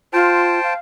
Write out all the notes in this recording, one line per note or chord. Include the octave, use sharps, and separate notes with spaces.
F4 C5 G5 A5
F5